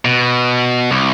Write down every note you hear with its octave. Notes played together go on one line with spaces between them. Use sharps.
B2
C2